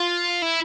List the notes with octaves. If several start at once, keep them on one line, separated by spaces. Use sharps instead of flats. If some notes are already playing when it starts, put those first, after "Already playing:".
Already playing: F4
E4